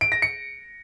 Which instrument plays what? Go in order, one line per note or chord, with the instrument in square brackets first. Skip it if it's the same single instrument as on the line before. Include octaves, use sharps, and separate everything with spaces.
[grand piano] D7
A#6
C#7